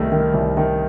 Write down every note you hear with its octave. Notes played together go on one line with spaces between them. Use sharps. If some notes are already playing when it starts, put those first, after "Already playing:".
Already playing: C2 D#3 A3
D#3
C2
D#3